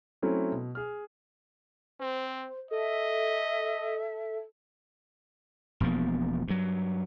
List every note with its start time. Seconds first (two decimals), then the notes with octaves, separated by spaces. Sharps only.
0.22 F#3 A3 C4 C#4 E4
0.52 B2
0.75 G#4 F6
2.00 C4 C5
2.71 A4 D#5 E5
5.80 E1 B2 F3 A#3
6.48 G2 F#3